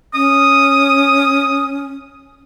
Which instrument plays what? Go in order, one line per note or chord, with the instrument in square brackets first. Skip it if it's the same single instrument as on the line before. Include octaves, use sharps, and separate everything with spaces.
[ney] C#4 [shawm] D#6